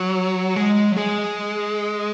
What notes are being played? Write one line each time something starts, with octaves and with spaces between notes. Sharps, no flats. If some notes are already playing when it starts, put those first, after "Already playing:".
Already playing: F#3
G#3
F#3
G#3